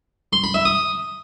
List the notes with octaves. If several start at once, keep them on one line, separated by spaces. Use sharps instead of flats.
C6
B5
E5
D#6